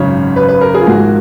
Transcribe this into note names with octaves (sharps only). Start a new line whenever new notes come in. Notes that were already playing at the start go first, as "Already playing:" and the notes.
Already playing: G#1 F#2 C#3 C#5
B4
B4
A#4
G#4
F4
G#1 G#2 F3 A#3 F#4